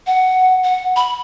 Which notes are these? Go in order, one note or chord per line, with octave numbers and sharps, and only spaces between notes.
F#5
F#5
B5